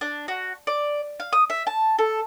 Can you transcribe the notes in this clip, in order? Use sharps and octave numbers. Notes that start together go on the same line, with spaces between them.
D4
F#4
D5
F5
D#6
E5
A5
A4